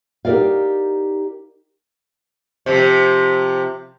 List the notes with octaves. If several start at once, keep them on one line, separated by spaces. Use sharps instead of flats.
D#4 G4 A4 A#4 D5 F5
C3 F3